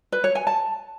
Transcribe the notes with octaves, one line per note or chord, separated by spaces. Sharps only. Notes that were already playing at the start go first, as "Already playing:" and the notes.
B4
C#5
G#5
A5